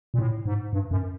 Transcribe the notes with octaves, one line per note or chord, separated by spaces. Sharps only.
A#2
A2
G#2
G2
F#2